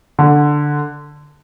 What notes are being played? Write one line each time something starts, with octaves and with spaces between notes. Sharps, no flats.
D3